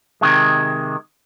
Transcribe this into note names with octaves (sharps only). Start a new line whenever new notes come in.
C3 D#3 G#3